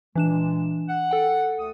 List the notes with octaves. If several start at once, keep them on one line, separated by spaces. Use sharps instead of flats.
A#2 E3 G#3 D4 E7
F#5
A4 G5
D2 A3 D#6